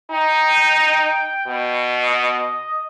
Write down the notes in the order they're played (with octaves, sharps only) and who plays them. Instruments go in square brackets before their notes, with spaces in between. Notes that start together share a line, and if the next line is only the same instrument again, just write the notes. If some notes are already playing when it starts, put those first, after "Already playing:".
[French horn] D#4 [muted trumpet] G5
[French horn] B2
[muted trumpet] D#5